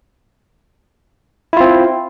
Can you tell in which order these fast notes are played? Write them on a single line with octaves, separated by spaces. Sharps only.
E4 F4 C4